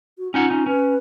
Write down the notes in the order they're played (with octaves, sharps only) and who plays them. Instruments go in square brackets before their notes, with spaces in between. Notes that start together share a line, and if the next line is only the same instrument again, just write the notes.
[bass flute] F#4
[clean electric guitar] C#4 D#4 F#5 [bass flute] F4
[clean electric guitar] C#4 D#4
[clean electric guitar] C#4 [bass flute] B4